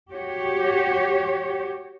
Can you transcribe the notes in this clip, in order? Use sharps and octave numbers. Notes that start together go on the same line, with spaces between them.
F#4 G4 C#5